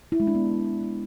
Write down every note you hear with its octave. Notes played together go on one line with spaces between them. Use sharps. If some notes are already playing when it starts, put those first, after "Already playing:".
E4
G#3
D4
B3